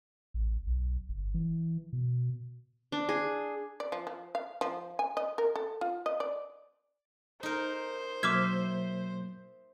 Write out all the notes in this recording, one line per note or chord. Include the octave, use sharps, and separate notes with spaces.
A1
B1
G1
E3
B2
D4
G#4
D5
F3
F3
F5
F3
G#5
D#5
A#4
A4
F4
D#5
D5
D#4 A#4 C5
B2 F#3 A#3 E5 D6 F6 G#6